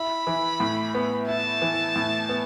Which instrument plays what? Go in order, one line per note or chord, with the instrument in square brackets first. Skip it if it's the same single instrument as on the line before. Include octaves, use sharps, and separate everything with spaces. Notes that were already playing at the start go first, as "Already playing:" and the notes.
Already playing: [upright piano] E4 [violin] B5
[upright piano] E3
A2
B3
[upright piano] E4 [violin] A5
[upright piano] E3
A2
B3